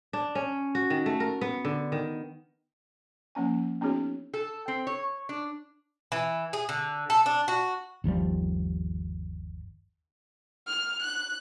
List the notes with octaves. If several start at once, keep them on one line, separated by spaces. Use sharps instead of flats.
D4
C#4
F#4
D#3
A3
A#4
B3
D3
D#3
F3 A#3 C#4 G#5
B3 C#4 D#4 F#4 G#4 C#5
A4
C4
C#5
D4
E3
G#4
D3
A4
D4
F#4
G1 D#2 F3 G3
F6
F#6